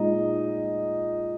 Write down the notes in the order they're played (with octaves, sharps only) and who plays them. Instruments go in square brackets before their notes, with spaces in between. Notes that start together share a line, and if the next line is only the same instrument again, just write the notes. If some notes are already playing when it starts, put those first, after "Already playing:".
Already playing: [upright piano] A#2 G#3 D#4 D#5